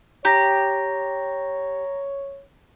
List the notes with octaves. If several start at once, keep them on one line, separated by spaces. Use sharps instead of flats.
G4 C#5 A#5 A#6